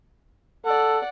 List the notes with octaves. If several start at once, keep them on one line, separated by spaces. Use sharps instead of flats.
A4 D5 F#5